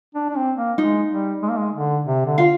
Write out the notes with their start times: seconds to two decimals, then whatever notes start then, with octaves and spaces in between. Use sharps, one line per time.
0.15 D4
0.29 D4
0.36 C4
0.57 A#3
0.78 G#3 D#4
1.10 G3
1.42 G#3
1.49 A#3
1.57 G#3
1.74 D3
2.06 C3
2.26 D3
2.38 F4 F5